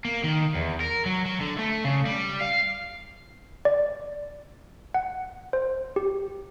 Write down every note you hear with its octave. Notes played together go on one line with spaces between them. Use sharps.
A#3
D#3
E2
A#4
F#3
F#3
D3
A3
C#3
G3
F5
D5
F#5
C5
G4